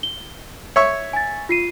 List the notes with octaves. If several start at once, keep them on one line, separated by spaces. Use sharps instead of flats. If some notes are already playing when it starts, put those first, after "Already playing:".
G7
C#5 E5 C#6
G#5 A6
F4 C7 D#7